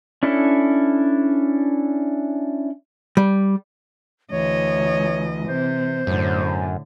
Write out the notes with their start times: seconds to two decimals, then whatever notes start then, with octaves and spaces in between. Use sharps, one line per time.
0.23 C#4 D4 E4 A4
3.17 G3
4.31 D2 E3 C#5 D#5
5.48 C3 C5
6.07 F#2 A2 D3